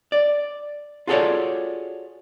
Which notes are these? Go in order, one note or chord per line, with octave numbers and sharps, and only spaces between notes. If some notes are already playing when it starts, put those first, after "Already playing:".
D5
F4 F#4 G#4 A4 C#5 D5